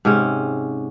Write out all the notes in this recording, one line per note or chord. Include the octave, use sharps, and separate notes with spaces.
G#2 C3 C#4